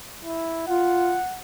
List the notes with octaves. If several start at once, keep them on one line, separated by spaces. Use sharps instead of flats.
E4
F4 F#5